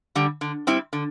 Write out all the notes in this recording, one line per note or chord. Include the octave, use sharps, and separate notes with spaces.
D3 G3
D3
G3 C4 E4
D3